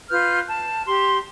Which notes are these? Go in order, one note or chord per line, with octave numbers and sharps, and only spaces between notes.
F4 B4 F6 G6
A5
G4 C6